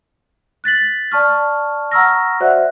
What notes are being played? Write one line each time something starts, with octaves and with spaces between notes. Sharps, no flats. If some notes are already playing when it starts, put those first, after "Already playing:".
F#6 A6 B6 F#7
D5 A5 C#6 F6
F#5 A#5 C#6 E6 F6 A#6
F#4 C5 D5 E5 F#5 F#6